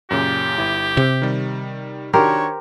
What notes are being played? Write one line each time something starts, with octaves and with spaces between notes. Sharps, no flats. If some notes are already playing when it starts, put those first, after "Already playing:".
F#2 A#2 C#3 G4
G1 E4
C3
D#3 G3
D#3 D4 F#4 G4 A#4 C5 C#5